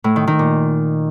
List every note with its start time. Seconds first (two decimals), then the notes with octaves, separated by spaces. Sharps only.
0.04 A2
0.16 D#3
0.27 D#3
0.39 A#2